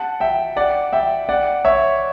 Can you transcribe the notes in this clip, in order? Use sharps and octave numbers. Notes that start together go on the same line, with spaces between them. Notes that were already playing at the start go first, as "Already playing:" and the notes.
Already playing: F#5 A5
E5 G5
D5 F#5
E5 G5
D5 F#5
C#5 E5